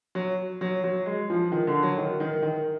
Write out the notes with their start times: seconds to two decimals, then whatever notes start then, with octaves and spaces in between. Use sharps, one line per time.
0.15 F#3
0.61 F#3
0.84 F#3
1.06 G#3
1.30 F3
1.52 D#3
1.67 D3
1.83 F#3
1.98 D#3
2.20 D#3
2.42 D#3